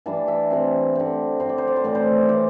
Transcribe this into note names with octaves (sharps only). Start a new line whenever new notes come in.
E3 G3 D4 A5
E5
C3 E3 C4
D3 C4
D3 C4 C5
D5
C5
D5
C5
A2 E3 C4 D5
C5
E3 C4 D5